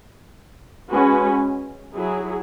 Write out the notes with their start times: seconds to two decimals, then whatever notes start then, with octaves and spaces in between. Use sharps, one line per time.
0.90 G#3 C#4 F#4 B4
1.94 F#3 E4 G#4